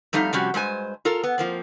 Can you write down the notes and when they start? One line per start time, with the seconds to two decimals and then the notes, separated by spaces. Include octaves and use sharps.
0.13 F2 G3 A3 D#4 F5
0.33 C3 F3 G3 C#4 F#4 G4
0.54 G2 G#3 C5 G#5
1.05 F4 A4 A#4
1.24 B3
1.38 F3 A#3 C4